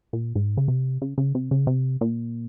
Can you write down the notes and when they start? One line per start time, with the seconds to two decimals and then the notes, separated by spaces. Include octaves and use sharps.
0.13 A#2
0.35 G#2
0.57 C#3
0.68 C3
1.02 C#3
1.18 C#3
1.35 C3
1.51 C#3
1.67 C3
2.01 A#2